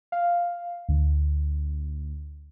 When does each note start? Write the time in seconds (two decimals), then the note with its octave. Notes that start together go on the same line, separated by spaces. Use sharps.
0.12 F5
0.89 D2